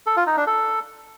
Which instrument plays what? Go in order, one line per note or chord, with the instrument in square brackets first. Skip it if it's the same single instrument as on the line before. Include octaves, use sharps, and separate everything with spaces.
[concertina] A4
F4
D#4
D4
A4